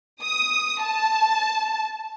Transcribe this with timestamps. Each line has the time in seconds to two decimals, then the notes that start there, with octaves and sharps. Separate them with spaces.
0.23 D#6
0.81 A5